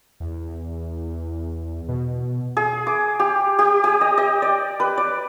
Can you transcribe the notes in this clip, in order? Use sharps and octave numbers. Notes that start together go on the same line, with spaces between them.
E2
B2
G#4
D6
G4
G4
G4
D#5
D#5
D5
B4
D5